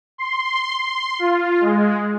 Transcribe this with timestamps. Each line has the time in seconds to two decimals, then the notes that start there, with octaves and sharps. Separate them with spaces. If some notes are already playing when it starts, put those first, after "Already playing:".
0.18 C6
0.78 C6
1.19 F4
1.61 G#3